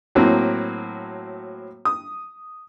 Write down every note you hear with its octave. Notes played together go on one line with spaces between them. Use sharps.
A2 F#3 A#3 C4
D#6